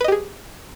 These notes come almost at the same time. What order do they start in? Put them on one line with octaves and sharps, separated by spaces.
B4 D#5 G4 G#4